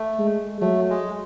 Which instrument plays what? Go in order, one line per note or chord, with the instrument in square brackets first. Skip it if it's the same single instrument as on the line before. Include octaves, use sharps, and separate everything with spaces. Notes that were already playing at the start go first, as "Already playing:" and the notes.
Already playing: [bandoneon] A3
[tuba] G#3
[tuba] F#3 [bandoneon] A3
[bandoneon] G#3